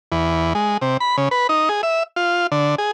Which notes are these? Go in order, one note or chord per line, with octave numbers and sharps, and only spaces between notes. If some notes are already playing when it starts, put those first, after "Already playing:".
E2
G#3
C3
B5
C#3
B4
D#4
G#4
E5
F4
D3
G#4